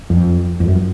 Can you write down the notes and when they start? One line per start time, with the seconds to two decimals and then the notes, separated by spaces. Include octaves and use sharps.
0.10 F2
0.60 F2
0.68 F#2